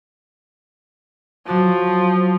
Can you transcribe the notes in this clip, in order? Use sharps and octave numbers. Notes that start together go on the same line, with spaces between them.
F3 F#3 F#4 D5